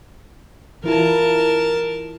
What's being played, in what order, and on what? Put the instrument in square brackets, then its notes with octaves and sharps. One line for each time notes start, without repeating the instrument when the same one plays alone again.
[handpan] E3 E4 F4 [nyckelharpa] A#4 A5